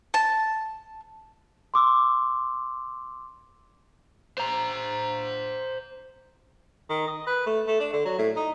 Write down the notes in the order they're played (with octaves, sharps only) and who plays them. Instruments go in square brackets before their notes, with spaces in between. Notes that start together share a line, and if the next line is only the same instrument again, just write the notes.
[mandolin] A5
[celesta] C6 D6 E6
[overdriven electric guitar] C5 A#5
[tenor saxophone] D#3
D#5
B4
A3
A3
D4
D3
F#3
A2
D#4